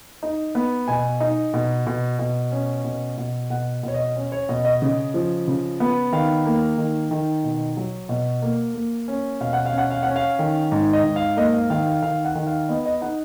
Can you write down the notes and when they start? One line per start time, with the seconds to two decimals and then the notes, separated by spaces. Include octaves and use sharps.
0.23 D#4
0.55 B3
0.88 B2 G#5
1.20 D#4
1.54 B2
1.87 B2
2.19 B2
2.52 C#4
2.84 B2
3.17 B2
3.50 B2 F#5
3.83 B2 C#5
3.94 D#5
4.16 C#4
4.32 C#5
4.49 B2 D#5
4.65 D#5
4.82 C#3
5.14 F3
5.47 C#3
5.80 B3
6.12 D#3 F5
6.46 A#3
6.78 D#3
7.11 D#3
7.44 B2
7.77 F#3
8.09 B2
8.42 A#3
8.74 A#3
9.08 C#4
9.41 B2 F5
9.53 F#5
9.66 F5
9.73 C#4
9.78 F#5
9.91 F5
10.03 C#4 F#5
10.16 F5
10.39 D#3
10.72 G#2
10.93 D#5
11.04 G#2
11.16 F5
11.37 A#3 D#5
11.54 F5
11.70 D#3 F5
11.87 F5
12.03 D#3 F5
12.25 F#5
12.35 D#3
12.47 F5
12.69 B3 D#5
12.86 D#5
13.01 D#4 F#5